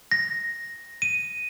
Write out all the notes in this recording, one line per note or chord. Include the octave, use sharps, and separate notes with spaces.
A#6
D#7